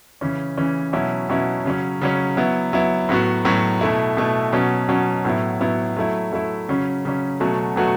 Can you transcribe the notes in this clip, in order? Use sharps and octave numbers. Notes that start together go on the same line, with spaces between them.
C#3 E3 C#4
C#3 E3 C#4
B2 F#3 C#4 E4
B2 F#3 C#4 E4
C#3 F#3 C#4
C#3 F#3 C#4
F#3 B3 E4
F#3 B3 E4
A2 F#3 B3 F#4
A2 F#3 B3 F#4
B2 A3 E4
B2 A3 E4
B2 F#3 C#4
B2 F#3 C#4
A2 F#3 B3 E4
A2 F#3 B3 E4
F#3 A3 E4
F#3 A3 E4
C#3 F#3 C#4
C#3 F#3 C#4
B2 F#3 A3 F#4
B2 F#3 A3 F#4